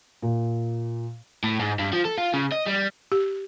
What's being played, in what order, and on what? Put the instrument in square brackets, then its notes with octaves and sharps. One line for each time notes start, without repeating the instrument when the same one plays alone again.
[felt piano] A#2
[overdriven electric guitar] A2
G#2
G2
F3
A4
F4
C#3
D#5
G3
[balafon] G4